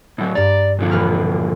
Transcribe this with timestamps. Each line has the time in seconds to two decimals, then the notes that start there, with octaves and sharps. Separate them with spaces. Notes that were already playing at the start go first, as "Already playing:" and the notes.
0.18 A2 F#3
0.35 G2 D5 A#5
0.79 A#2 D3 F3
0.91 E1 B4 F6